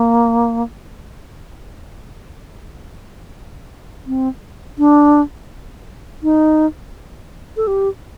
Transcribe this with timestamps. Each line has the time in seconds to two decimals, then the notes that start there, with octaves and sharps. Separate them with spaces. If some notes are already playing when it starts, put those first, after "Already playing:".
Already playing: A#3
4.07 C4
4.78 D4
6.23 D#4
7.57 A4
7.67 G4